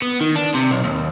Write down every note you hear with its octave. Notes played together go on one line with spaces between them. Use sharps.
B3
D#3
D4
C3
B1
D#2